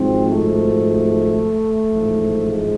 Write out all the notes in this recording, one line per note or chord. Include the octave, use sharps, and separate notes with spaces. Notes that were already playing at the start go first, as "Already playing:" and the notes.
Already playing: G#1 G#2 F3 C4
A3
A1 G#2 F3
G#3